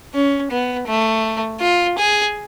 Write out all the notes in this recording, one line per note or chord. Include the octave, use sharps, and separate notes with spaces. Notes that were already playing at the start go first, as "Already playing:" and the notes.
C#4
B3
A3
F4
G#4